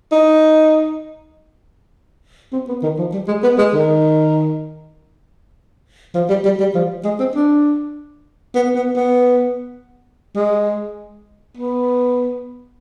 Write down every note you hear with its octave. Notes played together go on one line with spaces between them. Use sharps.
D#4
C4
B3
D#3
F3
G3
G#3
B3
G#3
D#3
F3
G3
G3
G3
F3
G#3
C4
D4
B3
B3
B3
G#3
B3